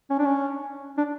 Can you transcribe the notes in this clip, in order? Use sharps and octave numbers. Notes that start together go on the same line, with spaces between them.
C#4
D4
C#4
D4